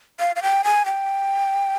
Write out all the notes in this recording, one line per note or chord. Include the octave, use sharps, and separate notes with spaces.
F5
F5
G5
G#5
G5